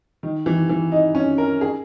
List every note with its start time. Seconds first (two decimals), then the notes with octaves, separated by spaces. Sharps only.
0.23 D#3
0.46 E3
0.69 E3
0.92 D#4
1.15 C#4
1.38 A#4
1.61 G#4